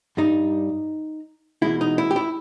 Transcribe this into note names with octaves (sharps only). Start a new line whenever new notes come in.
G2 G3 D#4
E2 B2 G#3 E4
D#4
E4
G4
E4